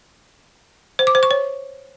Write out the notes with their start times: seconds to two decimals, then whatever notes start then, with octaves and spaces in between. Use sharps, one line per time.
0.99 C5
1.07 D6
1.15 C5
1.23 C#6
1.31 C#5